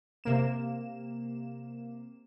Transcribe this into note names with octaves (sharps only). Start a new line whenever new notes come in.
C3 A#3 E7